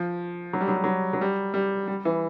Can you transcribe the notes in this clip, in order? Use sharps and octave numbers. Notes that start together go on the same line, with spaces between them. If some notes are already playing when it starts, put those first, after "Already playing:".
Already playing: F3
F#3
G3
F#3
G3
F#3
F#3
G3
G3
G3
E3